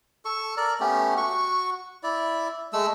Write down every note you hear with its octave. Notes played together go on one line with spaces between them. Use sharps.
A4 C#6
A#4 D5
A3 B3 C#4 G4
F#4 C#6
E4 D5
G#3 A3 A4 E6